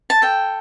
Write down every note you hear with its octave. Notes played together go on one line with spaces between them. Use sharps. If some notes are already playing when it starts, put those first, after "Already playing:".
A5
A4 G5